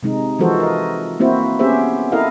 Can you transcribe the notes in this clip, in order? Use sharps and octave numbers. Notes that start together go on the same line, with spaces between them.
C3 G#3 D#4
E3 F3 G#3 F#4 A4 C5
A#4 D#5
A#3 C4 E4 F#4 C5
B3 C#4 G4 G#4 C5 E5
E4 A4 A#4 D#5 F5